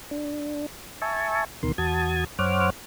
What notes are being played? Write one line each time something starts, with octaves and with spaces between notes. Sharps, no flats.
D4
E5 G#5 A5 C#6
D2 B2 D#3 A#4 C6
E2 F#4 A5 D#6 G#6
F#2 C5 C#5 F#5 D6 F6